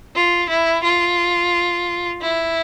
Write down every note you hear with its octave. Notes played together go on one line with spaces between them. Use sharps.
F4
E4
F4
E4